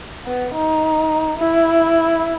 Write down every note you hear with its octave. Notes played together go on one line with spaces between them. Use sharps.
B3
D#4
E4